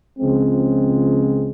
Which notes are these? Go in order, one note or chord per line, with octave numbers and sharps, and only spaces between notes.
C#2 C#3 F3 G#3 C4